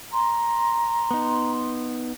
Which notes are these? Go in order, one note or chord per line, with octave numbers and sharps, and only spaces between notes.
A#5 C6
B3 D#4